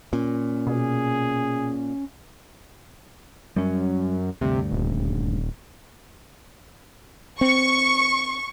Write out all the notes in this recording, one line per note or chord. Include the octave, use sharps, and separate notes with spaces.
A#2 C#4
B2 G#4
F#2 G3 C#4
D2 G2 C3
D#1
C4 C#6